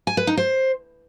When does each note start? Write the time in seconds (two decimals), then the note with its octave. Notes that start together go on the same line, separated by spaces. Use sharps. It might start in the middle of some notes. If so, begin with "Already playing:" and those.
0.07 G#5
0.17 B4
0.27 D#4
0.37 C5